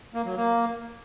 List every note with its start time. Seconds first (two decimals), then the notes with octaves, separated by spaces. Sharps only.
0.14 A#3
0.25 F#3
0.37 A#3